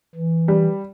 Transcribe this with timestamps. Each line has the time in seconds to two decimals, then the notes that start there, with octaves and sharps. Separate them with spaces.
0.15 E3
0.48 G3